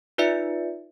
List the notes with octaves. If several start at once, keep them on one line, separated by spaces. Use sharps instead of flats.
D#4 F4 B4 D5 E5 C#7